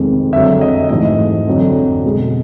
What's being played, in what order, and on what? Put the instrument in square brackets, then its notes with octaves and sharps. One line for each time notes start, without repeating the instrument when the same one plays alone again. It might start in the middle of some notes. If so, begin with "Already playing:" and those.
Already playing: [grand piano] F2 C3 D#3 G#3
F2 D3 F#3 E5
D#5
G#2 E3 A3 D#5
F2 D3 F#3
B2 G#3